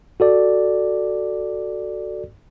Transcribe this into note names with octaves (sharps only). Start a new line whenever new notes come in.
F#4 A4 D5